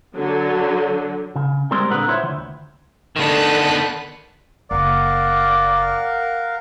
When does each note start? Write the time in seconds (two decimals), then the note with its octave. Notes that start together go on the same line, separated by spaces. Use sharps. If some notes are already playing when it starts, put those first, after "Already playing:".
0.15 D3 F#3
1.36 C#3
1.71 G3 G#3 C4 G#4 A#4 C5
1.90 A#2 D3 B4 F#5 A#5
2.08 E4 F4 C5 C#5 E5
2.23 D2 D#3
3.16 D3 D#3 B3 A5 F#6
4.71 F#1 A#4 D5 F5 F#5